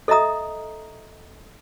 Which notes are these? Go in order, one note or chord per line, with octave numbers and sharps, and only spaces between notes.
A4 D#5 E5 A#5 D#6